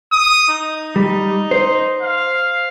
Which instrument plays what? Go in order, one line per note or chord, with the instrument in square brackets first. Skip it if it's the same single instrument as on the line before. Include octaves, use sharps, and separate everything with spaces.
[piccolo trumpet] D#6
D#4
[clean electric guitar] G3 [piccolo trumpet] D#4
[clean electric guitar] C5
[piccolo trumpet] F5